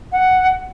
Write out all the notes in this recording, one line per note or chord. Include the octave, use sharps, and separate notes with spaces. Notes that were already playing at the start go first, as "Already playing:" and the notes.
F#5